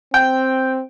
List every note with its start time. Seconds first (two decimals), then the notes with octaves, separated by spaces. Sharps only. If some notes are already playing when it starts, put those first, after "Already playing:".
0.14 C4 G5